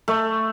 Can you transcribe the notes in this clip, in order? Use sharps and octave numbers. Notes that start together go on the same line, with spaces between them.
A3